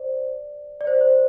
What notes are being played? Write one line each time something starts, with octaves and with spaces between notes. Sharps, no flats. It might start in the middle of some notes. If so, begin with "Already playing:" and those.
Already playing: C5 D5
D5
C5
C5